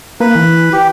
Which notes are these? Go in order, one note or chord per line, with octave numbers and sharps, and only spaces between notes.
A#3 B4
E3
G4